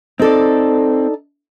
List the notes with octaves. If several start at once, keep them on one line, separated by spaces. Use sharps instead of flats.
C4 D#4 A4 D5